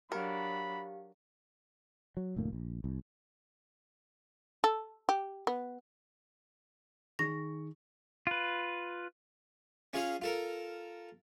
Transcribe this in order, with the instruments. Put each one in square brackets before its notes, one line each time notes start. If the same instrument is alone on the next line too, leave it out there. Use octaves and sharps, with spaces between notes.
[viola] F#3 D4 [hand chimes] G4 F5 [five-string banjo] A#4 [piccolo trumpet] B5
[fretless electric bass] F#3
F1 D2 A2 A#3
A#1
C2
[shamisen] A4
G4
B3
[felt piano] D#3 G#4 C#6 [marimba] A#6
[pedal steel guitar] F4 B4
[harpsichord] C#4 F4 G#4 F5
F4 A4 A#4